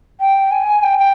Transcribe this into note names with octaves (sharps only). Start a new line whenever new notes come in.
G5
G#5
G5
G5